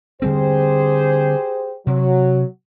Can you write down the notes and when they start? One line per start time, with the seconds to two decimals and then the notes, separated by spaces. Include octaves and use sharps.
0.22 D3 G3 C4 G4 G#4 C5
1.87 C3 F#3